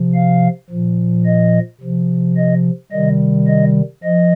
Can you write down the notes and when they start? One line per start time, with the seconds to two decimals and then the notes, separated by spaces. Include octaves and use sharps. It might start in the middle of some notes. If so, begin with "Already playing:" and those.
Already playing: C3 F3
0.15 F5
0.70 A#2 F3
1.26 D#5
1.81 C3 F3
2.37 D#5
2.92 C3 D#3 G3 D#5
3.48 D#5
4.03 F3 D#5